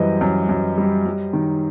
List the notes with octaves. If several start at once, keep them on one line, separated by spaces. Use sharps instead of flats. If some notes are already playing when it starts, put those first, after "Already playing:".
Already playing: F#2 E3 G3 C5 D#5
F#2
F#2
G3
G3
D#3